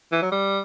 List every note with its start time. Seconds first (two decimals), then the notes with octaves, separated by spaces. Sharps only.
0.12 E3
0.22 F#3
0.32 G3